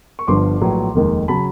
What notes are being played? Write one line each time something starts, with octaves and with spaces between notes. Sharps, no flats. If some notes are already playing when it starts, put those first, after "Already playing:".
C#6
G1 G2 D3 F3 C6 D6
A#1 A2 F#3 B3
F1 D#2 D#3 G#3
C#3 F#3 A5 B5